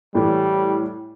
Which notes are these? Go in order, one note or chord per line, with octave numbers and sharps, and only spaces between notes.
A2 E3 G3